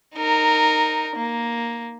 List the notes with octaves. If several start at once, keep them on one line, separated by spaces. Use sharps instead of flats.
D#4 A#4
A#3